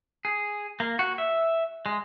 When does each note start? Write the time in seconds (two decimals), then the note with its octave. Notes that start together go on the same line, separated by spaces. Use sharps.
0.25 G#4
0.80 A#3
0.99 F#4
1.18 E5
1.86 G#3